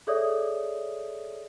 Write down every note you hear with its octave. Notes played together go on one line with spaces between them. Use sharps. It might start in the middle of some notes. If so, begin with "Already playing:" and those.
G#4 A4 C#5 D5 E5 D#6